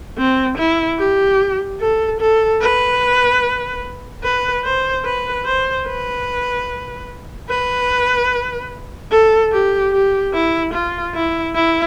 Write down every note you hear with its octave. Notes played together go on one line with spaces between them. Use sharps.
C4
E4
G4
A4
A4
B4
B4
C5
B4
C5
B4
B4
A4
G4
G4
E4
F4
E4
E4